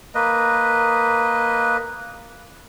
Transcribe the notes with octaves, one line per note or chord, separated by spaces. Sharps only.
A#3 B4 D#5